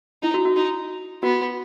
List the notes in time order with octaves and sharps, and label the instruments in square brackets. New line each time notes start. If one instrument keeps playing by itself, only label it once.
[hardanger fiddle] D#4 [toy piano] E4
[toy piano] F#4
F#4
[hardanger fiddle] D#4 [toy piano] F#4
[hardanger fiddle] B3 [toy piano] F#4